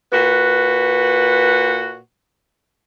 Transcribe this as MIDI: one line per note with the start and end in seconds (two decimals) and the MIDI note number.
0.13 1.98 46
0.13 1.98 66
0.13 1.98 71